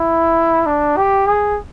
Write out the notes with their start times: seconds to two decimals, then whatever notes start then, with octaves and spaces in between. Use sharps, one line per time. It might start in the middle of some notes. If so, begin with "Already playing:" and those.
Already playing: E4
0.66 D4
0.97 G4
1.27 G#4